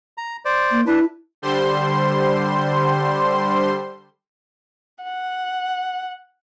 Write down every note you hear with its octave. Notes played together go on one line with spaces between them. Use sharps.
A#5
C5 D5
A#3
D4 E4 B4
D3 G3 C5 C6
F#5